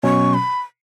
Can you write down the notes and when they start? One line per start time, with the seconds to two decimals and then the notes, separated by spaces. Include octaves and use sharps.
0.03 B2 F#3 C#4 C#6
0.34 B5